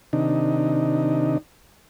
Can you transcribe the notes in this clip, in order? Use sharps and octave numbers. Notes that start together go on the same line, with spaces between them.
C3 D#3 D4 D#4